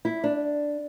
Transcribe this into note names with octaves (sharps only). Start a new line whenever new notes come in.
E4
D4